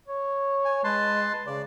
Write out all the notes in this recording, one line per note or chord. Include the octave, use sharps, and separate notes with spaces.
C#5
G#5
G#3 B4 A5 C6
C#3 D5